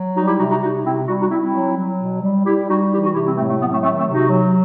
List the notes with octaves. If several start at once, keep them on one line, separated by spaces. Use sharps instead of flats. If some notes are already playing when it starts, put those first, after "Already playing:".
Already playing: F#3
G3 D#4 F#4
E4 G4
C3 D#4 F#4
D#4 F#4
C3 D#4 F#4
C3 C4 E4
G3 D#4 F#4
D#4 F#4
G3 C4 E4
C4 E4
F#3
F#3
B2
G3
G3 E4 G4
G3 D#4 F#4
E3 E4 G4
D#4 F#4
C3 E4 G4
C4 E4
A2 A3 C4
A3
F#3 B3
A3 C4
D#3 A3 C4
A3 C4
C3
D#4 F#4
F#3